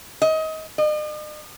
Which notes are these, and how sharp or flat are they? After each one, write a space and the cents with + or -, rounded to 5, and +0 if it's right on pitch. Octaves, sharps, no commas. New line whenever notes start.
D#5 +25
D#5 -45